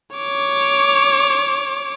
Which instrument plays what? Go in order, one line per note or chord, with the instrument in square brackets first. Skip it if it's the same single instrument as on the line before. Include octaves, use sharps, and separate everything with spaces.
[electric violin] C#5 D6